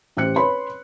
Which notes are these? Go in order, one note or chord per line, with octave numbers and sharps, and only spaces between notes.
A1 G4 C5 F#6 C#7
B4 C#5 B5 C6